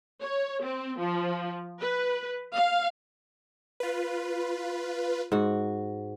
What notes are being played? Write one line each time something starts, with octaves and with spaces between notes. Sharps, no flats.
C#5
C4
F3
B4
F5
F4 B4
G#2 F#4